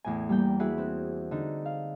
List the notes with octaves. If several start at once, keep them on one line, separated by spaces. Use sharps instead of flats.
E2 A2 G#5
G3 A#3 G5
E4 F#4 G#4 B4 F#5
C4 F#6
D3 D#4
F5